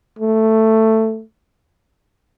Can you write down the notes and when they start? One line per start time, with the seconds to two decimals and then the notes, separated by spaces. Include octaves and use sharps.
0.19 A3